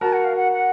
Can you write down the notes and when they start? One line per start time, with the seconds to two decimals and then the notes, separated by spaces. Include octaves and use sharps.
0.01 F#4 A#4 A5
0.12 F#5
0.24 F5
0.36 F#5
0.52 F#5